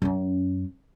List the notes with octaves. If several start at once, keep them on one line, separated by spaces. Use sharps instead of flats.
F#2 C#4